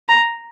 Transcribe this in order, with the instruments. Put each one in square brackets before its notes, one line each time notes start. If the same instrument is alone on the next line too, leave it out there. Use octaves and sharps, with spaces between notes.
[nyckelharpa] A#5